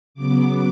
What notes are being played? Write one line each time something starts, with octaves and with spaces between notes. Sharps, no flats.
C#3 F#3 B3 D6